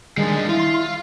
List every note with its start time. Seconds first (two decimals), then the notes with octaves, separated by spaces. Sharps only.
0.17 D#3 F3 G3 G#3 D4
0.49 E4 F4 C6